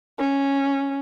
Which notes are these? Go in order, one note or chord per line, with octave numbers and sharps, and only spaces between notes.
C#4